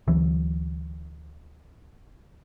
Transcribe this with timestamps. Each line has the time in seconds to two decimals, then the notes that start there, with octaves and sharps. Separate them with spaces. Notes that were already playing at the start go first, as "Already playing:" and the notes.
0.08 D2 E3 F#3